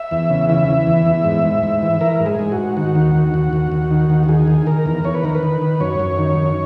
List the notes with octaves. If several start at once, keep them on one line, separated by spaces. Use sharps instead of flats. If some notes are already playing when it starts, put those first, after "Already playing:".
Already playing: E5
E2
C#3
E3 E5
E3
E2
E2
G#2
G#2
G#2
E3
E3 A#4
G#2
G#4
G#2
F#4
G#2
D#3 F#4
D#2
D#2
D#2
D#2
D#2
D#3
D#2
F#4
D#3 G#4
D#3
D#3 A#4
E2
E2 C#5
B4
D#3 A#4
B4
D#3
D#3
F#2 C#5
F#2
D#3
F#2